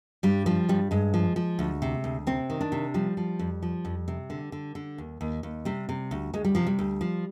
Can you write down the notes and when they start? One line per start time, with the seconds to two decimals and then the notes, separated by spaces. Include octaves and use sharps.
0.23 G2 G3
0.46 F3 G3
0.69 G2 G3
0.91 G2 G#3
1.14 F3
1.36 F3
1.59 D2
1.82 C3
2.04 D2
2.27 C3 C4
2.50 D#3
2.61 D4
2.72 C3
2.94 F3 G3
3.17 F3
3.39 F2
3.62 F3
3.85 F2
4.08 C3
4.30 D3
4.52 D3
4.75 D3
4.98 D#2
5.21 D#2
5.43 D#2
5.65 C3 G3
5.89 C3
6.11 D2
6.34 D2 G#3
6.45 G3
6.55 C3 F3
6.67 G3
6.79 D2
7.01 F3